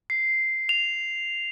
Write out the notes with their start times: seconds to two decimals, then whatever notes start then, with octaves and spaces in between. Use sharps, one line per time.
0.10 C7
0.69 F7